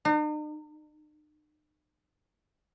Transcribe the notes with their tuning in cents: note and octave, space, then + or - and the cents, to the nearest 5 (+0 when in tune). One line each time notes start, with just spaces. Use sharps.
D#4 -45